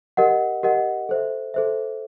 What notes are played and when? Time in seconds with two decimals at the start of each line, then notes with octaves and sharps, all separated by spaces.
0.17 G4 A#4 D#5 F#5
0.63 G4 A#4 D#5 F#5
1.09 A4 C5 E5
1.54 A4 C5 E5